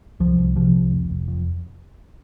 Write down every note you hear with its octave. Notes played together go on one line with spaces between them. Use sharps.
C2 F3
C2
C3 F3
C2
F1
F1
F2